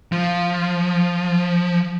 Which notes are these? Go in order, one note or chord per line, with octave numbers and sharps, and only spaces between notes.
F3